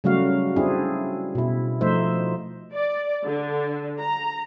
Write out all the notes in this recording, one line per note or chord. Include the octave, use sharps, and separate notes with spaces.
C#3 F#3 G3 A3 F#4 F5
C4 D4 E4 G#4
B2 E4
F3 A3 D#4 C5 E5
D5
D3
A#5